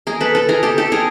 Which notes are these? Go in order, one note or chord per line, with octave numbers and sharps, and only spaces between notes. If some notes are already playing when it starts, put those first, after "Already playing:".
G#4 A#4
A4 B4
A4 B4
G#4 A#4
G4 A4
G4 A4
G#4 A#4